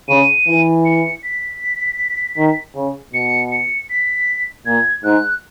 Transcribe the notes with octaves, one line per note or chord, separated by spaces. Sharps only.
C#3 D#7
E3
C#7
B6
D#3
C#3
B2 C#7
C#7
B6
A#2 G#6
G#2 F#6